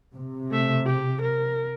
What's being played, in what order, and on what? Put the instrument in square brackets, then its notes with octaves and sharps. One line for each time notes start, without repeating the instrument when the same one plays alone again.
[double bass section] C3
[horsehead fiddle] A3 E5
G4
A#4